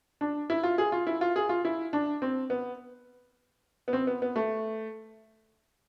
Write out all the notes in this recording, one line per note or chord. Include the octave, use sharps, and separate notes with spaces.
D4
E4
F4
G#4
F4
E4
F4
G#4
F4
E4
D4
C4
B3
B3
C4
B3
B3
A3